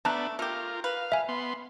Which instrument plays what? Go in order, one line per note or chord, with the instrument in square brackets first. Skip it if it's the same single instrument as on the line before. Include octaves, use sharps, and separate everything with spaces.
[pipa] A3 [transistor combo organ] B3 D4 [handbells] A5 A#5 F#6
[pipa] A3 G4 [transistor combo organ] F4 A#4
[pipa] B4 [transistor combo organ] F5
[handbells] E5 G#5
[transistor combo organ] B3 C6